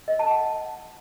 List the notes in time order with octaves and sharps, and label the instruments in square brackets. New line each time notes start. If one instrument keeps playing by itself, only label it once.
[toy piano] D#5
A5
F#5